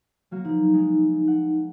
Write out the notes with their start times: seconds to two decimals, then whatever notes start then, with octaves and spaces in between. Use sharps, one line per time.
0.31 F#3 A#3 F#4
0.45 F3 D#4
0.74 G#3
1.28 F#5